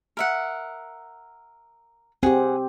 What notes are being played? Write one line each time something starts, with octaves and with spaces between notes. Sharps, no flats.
A#4 E5 F#5
C4 G4 G#4 F#5